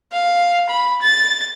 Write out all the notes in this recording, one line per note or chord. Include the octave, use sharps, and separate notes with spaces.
F5
B5
A6